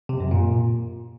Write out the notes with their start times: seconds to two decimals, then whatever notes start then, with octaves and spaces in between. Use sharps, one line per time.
0.09 C3
0.20 F#2
0.31 A#2